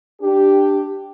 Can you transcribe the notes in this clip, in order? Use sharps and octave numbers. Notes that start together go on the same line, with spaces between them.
D4 G4